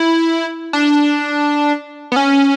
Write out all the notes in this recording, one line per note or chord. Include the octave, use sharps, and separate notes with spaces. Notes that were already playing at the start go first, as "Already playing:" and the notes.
Already playing: E4
D4
B3
C#4